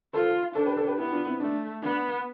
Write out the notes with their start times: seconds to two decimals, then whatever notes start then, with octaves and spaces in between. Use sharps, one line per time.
0.13 F4 A4 C5
0.55 D4 A4 C5
0.66 G4 B4
0.76 A4 C5
0.87 G4 B4
0.98 B3 E4 G4
1.12 D4 F4
1.26 C4 E4
1.40 A3 D4
1.82 B3 D4